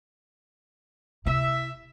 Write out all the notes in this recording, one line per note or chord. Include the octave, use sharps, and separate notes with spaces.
C3 E4 E5